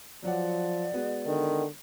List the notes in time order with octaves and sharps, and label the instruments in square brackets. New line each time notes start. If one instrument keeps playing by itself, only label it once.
[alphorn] F3 [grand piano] F#3 F#5 [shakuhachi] D5
[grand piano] G#3 B3 F#4
[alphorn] D3 [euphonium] D#3